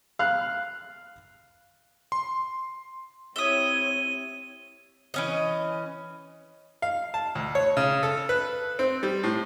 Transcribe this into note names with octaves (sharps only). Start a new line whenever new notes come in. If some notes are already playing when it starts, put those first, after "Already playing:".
F5 F6 F#6
C6
C4 E4 G4 C#5 E5 D#6 D#7 G7
E3 C#4 D#5
F5
A5
D2
C#5
C#3
A4
B4
C4
G3
A2